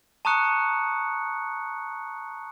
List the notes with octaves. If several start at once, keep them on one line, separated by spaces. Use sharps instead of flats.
A5 A#5 C#6 D#6 F#6 C#7